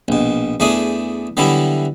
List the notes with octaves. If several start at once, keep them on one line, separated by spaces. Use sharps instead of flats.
A#1 B2
E2 A3 D4 G#4 D#6
D3 E3 F#3 G3 B3 E4